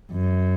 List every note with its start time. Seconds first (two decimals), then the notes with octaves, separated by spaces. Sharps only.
0.11 F#2